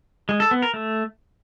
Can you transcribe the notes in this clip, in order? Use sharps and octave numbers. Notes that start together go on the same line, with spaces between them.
G#3
A4
B3
A#4
A3